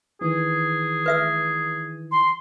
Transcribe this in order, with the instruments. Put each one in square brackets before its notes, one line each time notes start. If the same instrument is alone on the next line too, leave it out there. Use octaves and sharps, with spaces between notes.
[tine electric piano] D#3 E3 [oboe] G#4
[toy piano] B4 E5 E6
[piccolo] C6